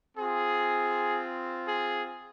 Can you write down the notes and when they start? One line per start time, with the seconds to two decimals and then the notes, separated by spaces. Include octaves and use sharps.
0.18 C4 F4 G#4
1.66 G#4